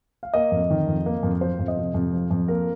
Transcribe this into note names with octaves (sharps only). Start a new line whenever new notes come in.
F5
A#3 D#5
F2
D#3
F2
A#3
F2
F3 C5
F2
D#5
C3
F2
F3
F2
A#3 A#4